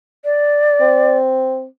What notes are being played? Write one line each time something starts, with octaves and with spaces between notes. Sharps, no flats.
D5
C4